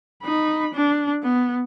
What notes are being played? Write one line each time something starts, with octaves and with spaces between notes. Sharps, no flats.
D#4 B5
D4
B3